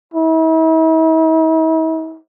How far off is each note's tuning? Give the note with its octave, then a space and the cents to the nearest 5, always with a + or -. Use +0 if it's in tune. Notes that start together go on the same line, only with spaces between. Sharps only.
E4 -45